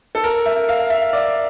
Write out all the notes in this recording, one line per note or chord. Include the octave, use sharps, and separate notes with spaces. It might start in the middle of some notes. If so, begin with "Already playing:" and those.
A4
A#4
E5
F5
E5
D5